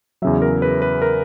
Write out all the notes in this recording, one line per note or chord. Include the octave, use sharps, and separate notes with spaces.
E2 C#3 F#3 E5
A#4
B4
B4
A#4